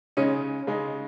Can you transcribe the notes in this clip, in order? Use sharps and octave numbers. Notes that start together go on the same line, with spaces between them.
C#3 G#3 C#4 D#4
C#3 G#3 D#4